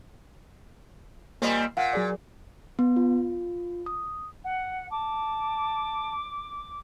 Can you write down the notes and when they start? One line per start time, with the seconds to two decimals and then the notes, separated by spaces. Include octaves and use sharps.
1.42 A#2 G3 A#3 C4 D#5
1.77 A#2 F5 F#5
1.93 F#3 G#4 D5
2.79 B3
2.96 F4
3.86 D#6
4.44 F#5
4.91 A5 D6